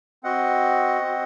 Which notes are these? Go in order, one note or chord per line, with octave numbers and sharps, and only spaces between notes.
C4 F#4 D#5 F#5
C4 F#4